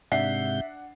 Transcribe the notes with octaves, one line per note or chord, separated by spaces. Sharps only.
G#2 C3 D4 E5 F#5 G6 C7